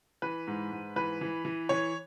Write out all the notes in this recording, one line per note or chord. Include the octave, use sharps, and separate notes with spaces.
E3 B4
G#2
G#2
E3 B4
E3
E3
E3 C#5